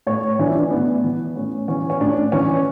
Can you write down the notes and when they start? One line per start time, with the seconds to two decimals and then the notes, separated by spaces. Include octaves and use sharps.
0.07 A2 C#5
0.39 E3 D4
0.47 E4
0.54 D4
0.71 A2 B3
1.04 E3
1.36 A2 C#4
1.68 E3 C#4
1.90 C#4
2.00 A2 D4
2.32 E3 C#4